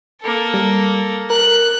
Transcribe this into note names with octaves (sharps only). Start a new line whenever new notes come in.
A#3 A4
G3
A#4 F#6